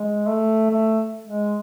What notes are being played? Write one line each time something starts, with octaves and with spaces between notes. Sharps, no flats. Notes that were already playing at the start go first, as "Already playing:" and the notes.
Already playing: G#3
A3
A3
G#3